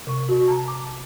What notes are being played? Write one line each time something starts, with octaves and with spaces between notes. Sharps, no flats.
C3 C#6
F#4
A5 A#5
D6